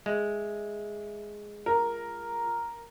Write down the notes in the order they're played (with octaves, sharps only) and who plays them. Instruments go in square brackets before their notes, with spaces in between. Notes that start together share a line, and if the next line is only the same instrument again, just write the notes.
[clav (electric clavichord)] G#3 [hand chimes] E5
[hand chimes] F4 [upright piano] A#4